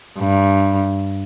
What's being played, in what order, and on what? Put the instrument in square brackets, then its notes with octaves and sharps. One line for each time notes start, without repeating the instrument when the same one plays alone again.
[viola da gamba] G2